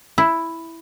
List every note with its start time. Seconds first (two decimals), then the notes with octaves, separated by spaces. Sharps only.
0.18 E4